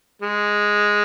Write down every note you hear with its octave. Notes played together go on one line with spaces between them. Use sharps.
G#3